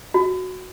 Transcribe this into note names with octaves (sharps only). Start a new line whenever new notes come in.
F#4